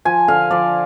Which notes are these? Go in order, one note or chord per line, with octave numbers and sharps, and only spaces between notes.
F3 G#5
D3 F5
F3 D5